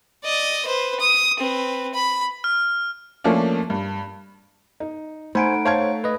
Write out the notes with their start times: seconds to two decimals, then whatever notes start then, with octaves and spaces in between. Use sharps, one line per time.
0.24 D5 D#5
0.66 B4 C5
1.00 D#6
1.39 C4 B4
1.94 B5
2.44 F6
3.24 F3 A3 A#3 C#4 D4
3.70 G2
4.80 D#4
5.35 A3 D#4 C5 F#5 G#5 B5 D7
5.65 C5 C#5 F5 A5 G#6
6.04 B4 D#5